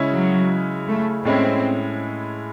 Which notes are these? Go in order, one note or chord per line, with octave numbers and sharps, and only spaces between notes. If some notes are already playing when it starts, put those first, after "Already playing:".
Already playing: C#3 G#3 C#4 E4
F#3
A3
A2 G#3 C4 C#4 E4